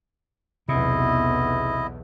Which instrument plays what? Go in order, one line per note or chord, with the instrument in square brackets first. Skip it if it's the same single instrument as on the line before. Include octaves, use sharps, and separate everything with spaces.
[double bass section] B1 E2 [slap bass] C3 [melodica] E4 D#5